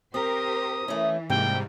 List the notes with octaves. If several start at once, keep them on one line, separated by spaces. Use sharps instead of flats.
C4 G4 A#4 C5 D#6
E3 A3 C#4
G#2 C3 G3 A#3 G5